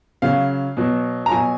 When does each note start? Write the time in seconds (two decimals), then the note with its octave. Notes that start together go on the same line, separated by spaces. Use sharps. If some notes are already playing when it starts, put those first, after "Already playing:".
0.22 C#3 F#3 F5
0.77 B2 F#3
1.26 A#5
1.31 B2 F#3 G#5